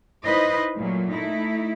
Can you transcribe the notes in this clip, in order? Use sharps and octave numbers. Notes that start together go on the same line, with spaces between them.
D#4 E4 B4 C5 D#5
A#2 F#3 A3
A3 D#4 E4